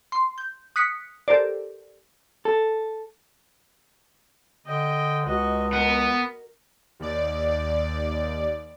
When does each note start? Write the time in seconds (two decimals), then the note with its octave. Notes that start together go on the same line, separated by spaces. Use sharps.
0.12 C6
0.38 G6
0.76 D#6 F#6 B6 C#7
1.28 G4 A4 A#4 C5 D5
2.45 A4
4.66 D3 D#5 G5
5.26 C#2 F#4 D#5
5.73 B3 A#4 A#5
7.00 D#2 D5